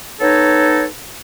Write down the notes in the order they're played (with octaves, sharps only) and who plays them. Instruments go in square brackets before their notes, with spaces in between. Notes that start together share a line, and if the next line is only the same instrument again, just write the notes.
[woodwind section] B3 D#4 A4 C#5